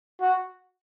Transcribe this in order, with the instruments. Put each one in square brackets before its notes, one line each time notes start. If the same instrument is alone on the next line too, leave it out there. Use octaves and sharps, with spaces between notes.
[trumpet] F#4